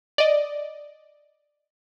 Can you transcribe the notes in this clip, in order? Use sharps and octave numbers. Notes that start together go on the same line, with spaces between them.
D5 D#5